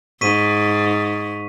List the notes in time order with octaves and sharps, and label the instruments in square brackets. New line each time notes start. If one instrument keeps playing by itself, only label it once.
[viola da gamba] G#2 [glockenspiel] C#6 B6 D#7